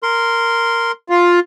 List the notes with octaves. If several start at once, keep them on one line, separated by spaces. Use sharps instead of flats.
A#4 C6
F4